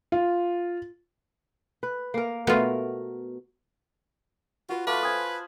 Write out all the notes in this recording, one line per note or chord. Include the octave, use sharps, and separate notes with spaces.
F4
B4
A#3 A#4
B2 A3 B3 F4 A#4
F4 F#4 B4
A3 F4 B4 D6
C5 G#5 D#6